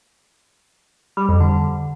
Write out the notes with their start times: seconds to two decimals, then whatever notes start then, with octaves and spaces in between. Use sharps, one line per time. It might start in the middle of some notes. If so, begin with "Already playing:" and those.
1.17 G3
1.29 F2
1.41 D3